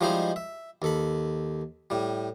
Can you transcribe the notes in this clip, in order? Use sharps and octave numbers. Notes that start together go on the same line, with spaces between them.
F3 G3 G#3 D#4 E4 C5
E5
D#2 A4 B5
A2 G3